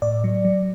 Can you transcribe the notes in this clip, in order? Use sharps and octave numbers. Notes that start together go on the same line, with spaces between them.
A2 D5
F#3
F#3